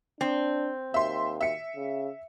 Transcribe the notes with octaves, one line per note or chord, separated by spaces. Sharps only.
C4 D4
D#2 E5 C6
E5 C#7
C#3